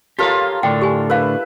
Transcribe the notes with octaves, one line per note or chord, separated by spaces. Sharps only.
F4 G4 A4 A#4 C#5 F5
A2 D3 D4 G5
G4 G#5
E4 A#4 B4 F5